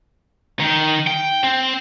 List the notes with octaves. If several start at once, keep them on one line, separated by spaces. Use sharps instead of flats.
D#3
G5
C4